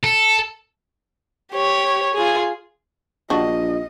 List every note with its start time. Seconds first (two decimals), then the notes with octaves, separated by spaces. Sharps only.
0.04 A4
1.52 G4 C#5
2.14 F4 G#4
3.30 A#1 D4 F#4 D#5